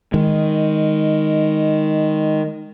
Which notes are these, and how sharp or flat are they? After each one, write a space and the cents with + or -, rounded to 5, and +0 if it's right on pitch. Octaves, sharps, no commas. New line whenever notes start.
D#3 +0 G#3 -10